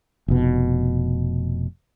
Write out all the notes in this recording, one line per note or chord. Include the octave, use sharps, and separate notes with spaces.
F1 B2